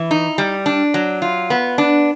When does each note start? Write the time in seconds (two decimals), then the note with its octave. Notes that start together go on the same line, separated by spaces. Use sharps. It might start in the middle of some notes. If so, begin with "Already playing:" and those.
Already playing: E3
0.11 D#4
0.38 G3
0.66 D4
0.94 F#3
1.22 F4
1.50 B3
1.78 D4